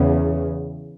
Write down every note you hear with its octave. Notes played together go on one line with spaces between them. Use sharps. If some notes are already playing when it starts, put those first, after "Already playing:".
Already playing: E2 C#3